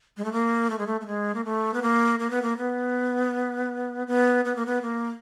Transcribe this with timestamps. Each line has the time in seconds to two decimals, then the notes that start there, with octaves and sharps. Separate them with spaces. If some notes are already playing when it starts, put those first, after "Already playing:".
0.17 G#3
0.24 A3
0.32 A#3
0.70 A3
0.78 G#3
0.87 A3
1.01 A3
1.07 G#3
1.35 A#3
1.45 A3
1.74 B3
1.82 A#3
2.19 A#3
2.30 B3
2.42 A#3
2.57 B3
4.07 B3
4.45 B3
4.56 A#3
4.66 B3
4.82 A#3